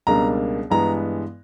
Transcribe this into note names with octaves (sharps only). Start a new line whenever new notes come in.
C#2 B2 G3 A#3 D4 A#5
G2 E3 G#3 B3 A#5